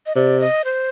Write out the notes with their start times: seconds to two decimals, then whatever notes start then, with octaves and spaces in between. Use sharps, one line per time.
0.06 D#5
0.16 C3 D5
0.40 D#5
0.65 C5